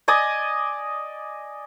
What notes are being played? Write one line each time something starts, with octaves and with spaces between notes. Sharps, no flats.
D5 D#5 G#5 D#6